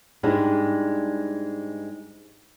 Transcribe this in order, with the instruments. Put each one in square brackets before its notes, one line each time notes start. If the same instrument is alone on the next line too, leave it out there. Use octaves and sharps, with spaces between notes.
[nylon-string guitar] G#2 G3 G#3 D4 E4